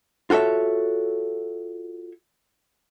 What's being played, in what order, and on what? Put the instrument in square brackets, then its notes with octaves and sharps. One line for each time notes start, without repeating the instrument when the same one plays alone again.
[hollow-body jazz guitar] F4 F#4 A4 C#5 E5